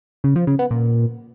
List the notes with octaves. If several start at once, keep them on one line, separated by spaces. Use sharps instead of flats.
C#3
F3
C#3
B3
A#2